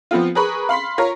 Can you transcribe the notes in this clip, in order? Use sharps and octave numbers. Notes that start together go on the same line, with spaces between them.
F3 B3 C4 F4
G#4 A#4 B4 B5 C#6
F5 B5 C6 B6
F4 A#4 C#5 F5